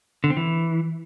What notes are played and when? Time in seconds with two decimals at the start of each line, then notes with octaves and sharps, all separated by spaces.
0.24 D3
0.30 C4
0.37 E3